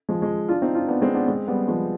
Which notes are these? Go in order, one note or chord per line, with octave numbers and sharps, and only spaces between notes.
F3 G#3
F3 G#3
D4 F4
C4 D#4
D4 F4
B3 D4
G#3 C4
B3 D4
G#3 C4
G3 B3
F3 G#3